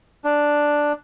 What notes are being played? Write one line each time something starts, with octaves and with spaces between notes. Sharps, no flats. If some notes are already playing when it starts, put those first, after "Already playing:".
D4